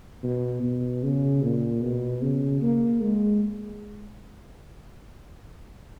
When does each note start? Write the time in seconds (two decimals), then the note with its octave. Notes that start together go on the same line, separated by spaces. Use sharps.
0.23 B2
0.63 B2
1.03 C#3
1.43 A#2
1.82 B2
2.22 C#3
2.62 A#3
3.01 G#3